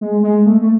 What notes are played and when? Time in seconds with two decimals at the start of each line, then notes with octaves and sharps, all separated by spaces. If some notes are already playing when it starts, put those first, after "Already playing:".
0.01 G#3
0.23 G#3
0.46 A3
0.61 A3